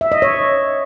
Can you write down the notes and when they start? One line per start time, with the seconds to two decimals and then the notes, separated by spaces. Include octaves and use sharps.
0.01 E5
0.12 D#5
0.22 C#5